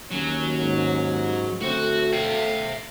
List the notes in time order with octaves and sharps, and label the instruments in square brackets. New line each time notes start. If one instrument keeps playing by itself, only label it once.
[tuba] D#2 [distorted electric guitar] F#3 [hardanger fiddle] C#4
[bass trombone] G#2
[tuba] D2 [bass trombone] A3 [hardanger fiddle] C4 [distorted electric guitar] F#4
[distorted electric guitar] E5 G5 [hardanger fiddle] F5